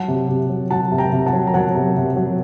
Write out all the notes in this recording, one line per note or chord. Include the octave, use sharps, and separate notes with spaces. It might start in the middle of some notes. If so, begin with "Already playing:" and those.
Already playing: F#3 F#5 A5
C3
C3
F#3
F#3 F#5 A5
C3
G5 A#5
C3
F#5 A5
F#3
A#5
F#3 F#5 A5
C3
C3
F#3